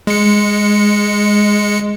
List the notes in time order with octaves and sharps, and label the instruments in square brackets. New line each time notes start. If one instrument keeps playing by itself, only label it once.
[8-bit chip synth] G#3 C#7